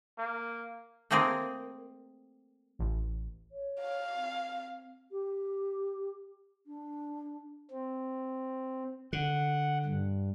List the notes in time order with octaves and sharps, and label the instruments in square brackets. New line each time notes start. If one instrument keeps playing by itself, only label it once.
[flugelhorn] A#3
[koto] A3 A#3 C4 G#4 A#4
[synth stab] A1
[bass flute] C#5
[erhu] F5
[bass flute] C4
G4
D4
[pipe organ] C4
[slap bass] D3 [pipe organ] F#5
[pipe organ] G2